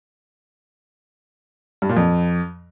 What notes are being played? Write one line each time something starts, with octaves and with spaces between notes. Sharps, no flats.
G2
A#2
F2